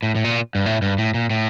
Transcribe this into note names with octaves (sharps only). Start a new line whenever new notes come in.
A2
A2
A#2
G2
A2
G2
A2
A#2
A2